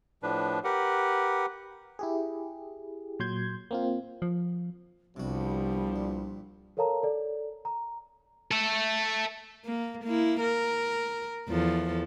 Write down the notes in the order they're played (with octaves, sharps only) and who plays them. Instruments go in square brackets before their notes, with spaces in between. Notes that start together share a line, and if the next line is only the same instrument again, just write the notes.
[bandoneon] A2 F3 D4 B4
G4 A#4 B4 F#5
[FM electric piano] E4 G4 G#4
A#2 F#3 C6 G6 G#6
A#3 C4 F4
[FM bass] F3
[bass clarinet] C2 [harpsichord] C3 F#4 [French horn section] F3 B3 D4 [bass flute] G3
[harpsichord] A#2
[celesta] A4 A#4 C#5 F5 A5 A#5
A4 D5
A#5
[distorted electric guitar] A4 E5
[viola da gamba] A#3
A#3 E4
A#4
E2 F3 A4